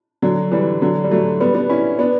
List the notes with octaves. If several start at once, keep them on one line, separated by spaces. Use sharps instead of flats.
D3 F#3
E3 G3
D3 F#3
G3
F#3 A3
G3 B3
B3 D4
C#4 E4
B3 D4